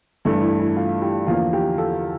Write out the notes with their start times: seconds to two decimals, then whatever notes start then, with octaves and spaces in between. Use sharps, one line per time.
0.25 G2 E3 A3 E4
0.42 E4
0.59 E4
0.76 F4
1.01 E4 G4
1.27 E2 D3 F3 A#3 F4
1.53 E4 G4
1.78 F4 A4